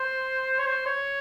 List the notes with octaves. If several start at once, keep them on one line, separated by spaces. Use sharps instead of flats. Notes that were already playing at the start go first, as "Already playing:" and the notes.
Already playing: C5
C#5
C5
C#5